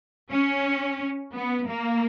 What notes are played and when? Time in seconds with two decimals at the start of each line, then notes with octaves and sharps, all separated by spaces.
0.30 C#4
1.34 B3
1.68 A#3